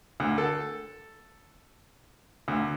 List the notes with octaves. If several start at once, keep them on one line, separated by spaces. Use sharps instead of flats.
D2
A4
D2